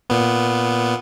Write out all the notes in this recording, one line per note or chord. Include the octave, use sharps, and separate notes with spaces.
A#2 B3